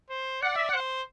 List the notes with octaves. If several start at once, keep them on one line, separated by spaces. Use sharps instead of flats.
C5
D5 F#5
E5
C5 F#5